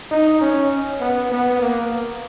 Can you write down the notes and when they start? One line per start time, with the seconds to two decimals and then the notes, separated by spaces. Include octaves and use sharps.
0.11 D#4
0.41 C#4
1.00 B3
1.32 B3
1.61 A#3